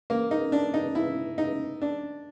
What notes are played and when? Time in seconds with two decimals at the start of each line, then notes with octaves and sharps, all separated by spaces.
0.10 A#3
0.31 D#4
0.52 D4
0.74 D#4
0.95 E4
1.38 D#4
1.82 D4